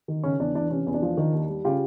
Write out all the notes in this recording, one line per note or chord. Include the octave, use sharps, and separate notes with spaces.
D#3
C#3 C#4
E2 D4
E3 D4
C3 C#4
E2
D4
F3
D#3
D#2
G3
C#3 F4 G4